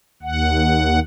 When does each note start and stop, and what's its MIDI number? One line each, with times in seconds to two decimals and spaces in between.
0.23 0.99 39
0.23 0.99 78